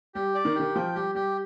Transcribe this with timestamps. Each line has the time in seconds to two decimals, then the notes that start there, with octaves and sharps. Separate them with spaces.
0.15 G3 G4
0.35 D5
0.45 D#3
0.55 D#3 G4
0.75 F3 G5
0.95 G3 G4
1.15 G3 G4